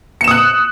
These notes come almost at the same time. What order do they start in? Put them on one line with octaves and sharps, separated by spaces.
C#7 E7 D#6 F#6